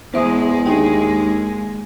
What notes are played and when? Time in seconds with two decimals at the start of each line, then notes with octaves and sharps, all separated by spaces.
0.14 E2 G#3 C5 E5 D#6
0.66 D#2 D4 G#4 G5